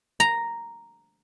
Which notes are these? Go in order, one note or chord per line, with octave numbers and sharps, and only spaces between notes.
A#5